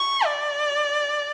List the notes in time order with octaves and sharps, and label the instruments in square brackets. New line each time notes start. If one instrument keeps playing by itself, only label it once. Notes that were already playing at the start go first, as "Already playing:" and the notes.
Already playing: [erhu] C#6
D5